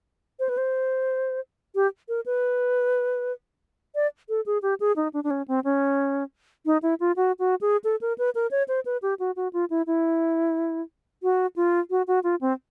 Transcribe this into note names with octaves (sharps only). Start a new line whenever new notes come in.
C5
B4
C5
G4
A#4
B4
D5
A4
G#4
G4
G#4
D#4
D4
D4
C#4
C4
C#4
D#4
E4
F4
F#4
F#4
G#4
A4
A#4
B4
A#4
C#5
C5
B4
G4
F#4
F#4
F4
E4
E4
F#4
F4
F#4
F#4
F4
C4